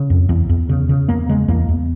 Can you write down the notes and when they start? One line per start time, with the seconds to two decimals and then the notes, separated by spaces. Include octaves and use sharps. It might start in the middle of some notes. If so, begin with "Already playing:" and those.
Already playing: C#3
0.10 F2
0.29 E2
0.49 E2
0.69 C#3
0.89 C#3
1.09 E2 A#3
1.29 C#3 G#3
1.48 E2 A#3
1.69 E2